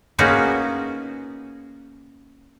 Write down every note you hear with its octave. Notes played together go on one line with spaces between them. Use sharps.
A#3 B3 C#4 D#4 F#4 G#4